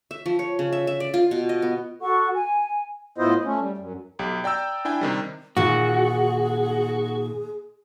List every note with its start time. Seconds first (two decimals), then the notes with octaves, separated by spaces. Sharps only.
0.11 E5
0.26 F3
0.39 C#5
0.59 C#3
0.73 E5
0.87 E5
1.00 D5
1.14 F4
1.31 B2
1.49 D#5
1.62 B3
2.01 F#4 A4 F#5 C#6
2.35 G#5
3.18 A2 B3 E4 F4 C5 D#5
3.45 A3 C#4
3.59 G3
3.78 F#2
4.19 B1 G4
4.44 D5 G5 A#5 E6 G6
4.85 D4 E4 G5 G#5
5.01 C3 D#3 G3
5.57 A#2 D#3 F#4 G#4